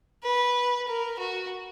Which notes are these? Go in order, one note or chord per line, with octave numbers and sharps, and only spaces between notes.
B4
A#4
F#4